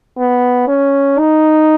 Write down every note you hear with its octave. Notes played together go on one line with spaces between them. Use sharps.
B3
C#4
D#4